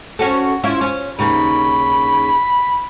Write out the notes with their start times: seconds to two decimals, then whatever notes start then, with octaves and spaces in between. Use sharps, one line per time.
0.19 C#4 F#4 A4
0.64 C#4 E4 F4
0.81 C#4
1.19 D#2 C#3 D#4 B5